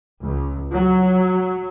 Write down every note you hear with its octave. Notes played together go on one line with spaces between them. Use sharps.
C#2
F#3